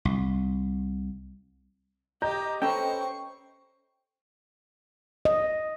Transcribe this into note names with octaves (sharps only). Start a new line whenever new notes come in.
C2
G4 D#5 A#5 G6
C#4 A4 B4 C5 G5 C#6
D#5